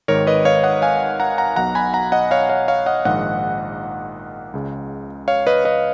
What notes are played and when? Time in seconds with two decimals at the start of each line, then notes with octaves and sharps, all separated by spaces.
0.08 G#1 G#2 D#3 A#4 C#5
0.27 B4 D#5
0.45 C#5 F5
0.64 D#5 F#5
0.82 F5 G#5
1.20 F#5 A#5
1.38 F#5 A#5
1.56 B1 B2 F#5 A#5
1.75 G#5 B5
1.94 F#5 A#5
2.12 D#5 F#5
2.31 C#5 F5
2.49 C#5 F5
2.68 C#5 F5
2.86 D#5 F#5
3.05 A#1 G#2 D#3 D#5 F#5
4.54 C#2 C#3
5.28 C#5 F5
5.47 B4 D#5
5.65 B4 D#5